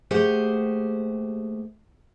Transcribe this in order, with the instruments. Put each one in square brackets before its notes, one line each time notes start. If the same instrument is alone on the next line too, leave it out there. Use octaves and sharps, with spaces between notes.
[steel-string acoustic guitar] D#2 A3 G4 G#4 C5 F#5